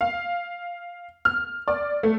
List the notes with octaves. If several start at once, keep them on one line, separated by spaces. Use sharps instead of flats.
F5
F6
D5
A3